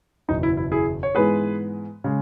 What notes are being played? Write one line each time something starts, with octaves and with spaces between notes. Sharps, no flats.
F#1 E2 B2 F#3 D#4
E4
E4
E4 G#4
C#5
G#2 E3 G#3 B3 G#4 B4
C#3 G#3